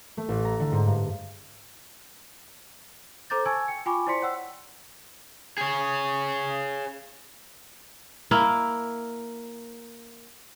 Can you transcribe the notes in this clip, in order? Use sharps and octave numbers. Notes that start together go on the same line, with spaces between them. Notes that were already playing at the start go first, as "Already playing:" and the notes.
A3
A1
A#5
D3
G#2
G2
A4 C5 A#5 D6 G6 A6
G#5 A5 C#6 E6 G#6
G5 C#7
F4 G5 G#5 B5 C#6 D6
E4 C5 D5 C6 B6 C#7
C#5 F#5 G5 E6
G#4 C#5
A#3 E4 A#4